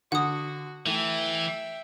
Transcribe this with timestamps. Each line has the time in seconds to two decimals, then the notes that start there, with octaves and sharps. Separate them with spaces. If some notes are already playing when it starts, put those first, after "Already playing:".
0.12 D3 F#4 F#5 D#6
0.86 E3 A3 E5 G5